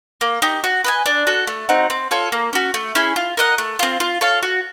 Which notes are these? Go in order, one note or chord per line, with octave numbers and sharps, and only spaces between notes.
A#3
D#4 G4
F#4
B4 D#5 G#5
D4
F#4 A4
A3
C4 D#4 F#4
C4
F4 A4 C#5
A#3
C#4 F#4
A3
C#4 E4 G#4
F4
A#4 D#5 F#5
A3
C4 F4
F4
A4 C#5 F5
F#4